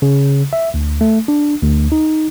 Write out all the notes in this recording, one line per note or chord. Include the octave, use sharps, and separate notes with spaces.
C#3
E5
D2
A3
D4
D2
D#4